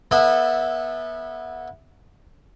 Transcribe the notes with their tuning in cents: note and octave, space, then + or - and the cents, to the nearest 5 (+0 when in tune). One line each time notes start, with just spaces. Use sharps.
B3 -25 E4 -15 A4 +0